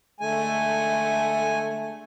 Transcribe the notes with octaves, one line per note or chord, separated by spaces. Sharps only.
D3 G#3 A3 G#5